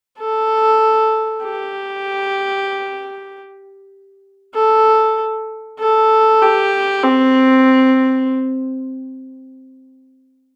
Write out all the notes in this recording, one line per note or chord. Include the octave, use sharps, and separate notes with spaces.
A4
G4
A4
A4
G4
C4